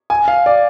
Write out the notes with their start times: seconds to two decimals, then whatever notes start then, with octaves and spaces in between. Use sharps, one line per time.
0.10 G#5
0.28 F5
0.46 D5